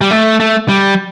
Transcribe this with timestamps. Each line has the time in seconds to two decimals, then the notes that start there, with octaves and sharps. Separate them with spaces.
0.01 G3
0.11 A3
0.40 A3
0.69 G3